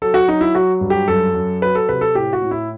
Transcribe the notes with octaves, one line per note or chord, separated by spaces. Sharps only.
F#3 A4
F#4
F#3 D#4
E4
F#3 F#4
G2
G4
F#2 A4
F#2
F#3 B4
A4
C3 B4
A4
A2 G4
F#4
A2
E4